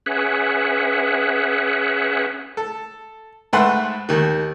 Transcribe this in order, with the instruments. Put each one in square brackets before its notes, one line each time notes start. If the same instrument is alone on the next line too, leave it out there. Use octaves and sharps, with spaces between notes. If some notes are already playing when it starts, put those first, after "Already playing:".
[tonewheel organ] C#4 G#4 B4 E5 F#5
[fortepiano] A4
G#2 A3 B4 F#5 C6
D#2 D#3